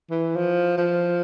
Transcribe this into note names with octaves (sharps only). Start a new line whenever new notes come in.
E3
F3
F3